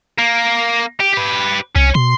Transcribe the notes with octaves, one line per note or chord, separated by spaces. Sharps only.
A#3
G4
G4 B4
C2 C#4
B2 C6